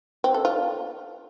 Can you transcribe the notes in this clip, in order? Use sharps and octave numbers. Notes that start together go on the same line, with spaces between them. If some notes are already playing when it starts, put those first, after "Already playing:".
C4
A4
F4